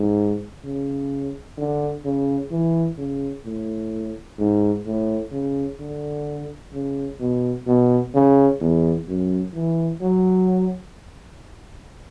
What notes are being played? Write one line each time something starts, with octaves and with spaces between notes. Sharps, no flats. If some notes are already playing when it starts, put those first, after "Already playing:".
Already playing: G#2
C#3
D3
C#3
E3
C#3
A2
G#2
A2
C#3
D3
C#3
B2
B2
C#3
E2
F#2
E3
F#3